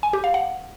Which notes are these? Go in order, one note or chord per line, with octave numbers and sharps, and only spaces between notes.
G#5
G4
F5
F#5